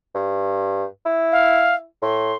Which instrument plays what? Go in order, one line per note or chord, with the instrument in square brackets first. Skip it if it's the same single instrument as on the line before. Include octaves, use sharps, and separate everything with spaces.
[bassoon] G2
E4
[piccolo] F5
[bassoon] A2 [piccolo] C6